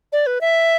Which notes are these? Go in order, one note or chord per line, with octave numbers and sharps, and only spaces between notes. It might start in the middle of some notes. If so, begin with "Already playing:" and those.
D5
B4
E5